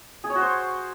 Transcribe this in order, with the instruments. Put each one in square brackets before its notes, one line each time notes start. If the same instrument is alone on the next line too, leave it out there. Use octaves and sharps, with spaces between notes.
[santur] G#4
C#5
F#4
C5